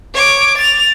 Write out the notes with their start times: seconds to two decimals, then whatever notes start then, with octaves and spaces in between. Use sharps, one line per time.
0.14 C#5 D6
0.57 A6 F7